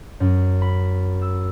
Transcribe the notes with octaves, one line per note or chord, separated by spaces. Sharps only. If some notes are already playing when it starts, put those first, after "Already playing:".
F#2
B5
E6